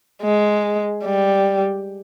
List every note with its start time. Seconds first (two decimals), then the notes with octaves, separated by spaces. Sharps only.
0.22 G#3
1.04 G3